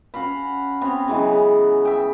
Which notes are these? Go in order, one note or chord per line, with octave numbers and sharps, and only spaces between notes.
C#4 F#4 F5 B5
B3 C4 F#4 C#5
C#3 E3 F#3 G#3
E5 G5